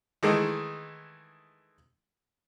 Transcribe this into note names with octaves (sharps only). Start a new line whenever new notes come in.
D#3 E3 G#3 A3